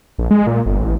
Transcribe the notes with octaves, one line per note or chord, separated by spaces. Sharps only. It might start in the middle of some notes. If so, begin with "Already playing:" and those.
A#1
G#3
A#2
G1
A1